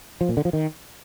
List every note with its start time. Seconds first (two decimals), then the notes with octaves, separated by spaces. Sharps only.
0.21 F3
0.29 A#2
0.37 D3
0.45 F3
0.53 D#3